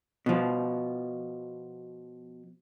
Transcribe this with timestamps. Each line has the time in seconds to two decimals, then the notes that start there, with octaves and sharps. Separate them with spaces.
0.26 B2 F3